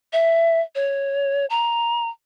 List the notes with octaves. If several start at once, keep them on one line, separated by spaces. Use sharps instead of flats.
E5
C#5
A#5